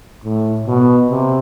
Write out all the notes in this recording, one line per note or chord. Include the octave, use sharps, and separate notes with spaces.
A2
B2
C3